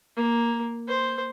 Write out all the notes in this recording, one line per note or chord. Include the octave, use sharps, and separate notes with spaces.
A#3
C5